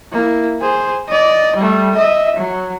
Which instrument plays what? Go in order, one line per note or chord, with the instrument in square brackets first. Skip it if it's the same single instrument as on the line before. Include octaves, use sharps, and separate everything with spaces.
[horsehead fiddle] A#3 E4
G#4 C5
D5 D#5
G3 A3
D#5 E5
F#3